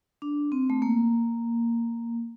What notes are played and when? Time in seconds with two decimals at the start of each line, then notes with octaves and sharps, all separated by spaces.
0.22 D4
0.52 C4
0.70 A3
0.82 A#3